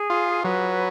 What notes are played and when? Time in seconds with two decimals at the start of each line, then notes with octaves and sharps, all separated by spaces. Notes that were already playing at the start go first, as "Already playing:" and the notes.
Already playing: G#4
0.10 F4
0.44 F#3 B4